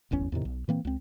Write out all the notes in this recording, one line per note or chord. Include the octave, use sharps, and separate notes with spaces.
D1 G1 E2 C#4
E2 A2 C3 D#3
B1
A#2 E3 A#3 C4
C#2 C4